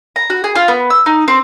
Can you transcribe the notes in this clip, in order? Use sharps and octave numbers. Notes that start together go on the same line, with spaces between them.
A#5
F#4
G#4
F4
B3
E6
D#4
C4